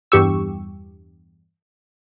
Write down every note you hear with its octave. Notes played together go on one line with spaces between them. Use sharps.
E2 G2 G4 C#6 E6